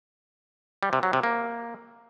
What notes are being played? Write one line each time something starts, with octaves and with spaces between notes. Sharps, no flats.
G3
C3
F#3
C3
A#3